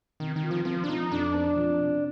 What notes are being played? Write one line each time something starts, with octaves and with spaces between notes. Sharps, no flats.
C3 D#3
D#3
F4
F3
F3 C4
D4
F3 D#4
F2 D4
C4
F3
C3